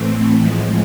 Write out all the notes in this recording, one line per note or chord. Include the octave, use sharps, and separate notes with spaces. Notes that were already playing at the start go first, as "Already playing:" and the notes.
Already playing: A2 E3 A3 C4
A2 F3 G#3